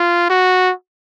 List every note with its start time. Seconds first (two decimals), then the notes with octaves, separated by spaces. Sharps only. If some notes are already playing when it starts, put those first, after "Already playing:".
Already playing: F4
0.30 F#4